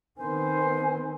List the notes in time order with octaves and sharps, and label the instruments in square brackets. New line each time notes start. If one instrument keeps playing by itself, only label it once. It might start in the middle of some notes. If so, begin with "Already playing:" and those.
[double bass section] D#3 B3 C4 [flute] C5 [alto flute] G#5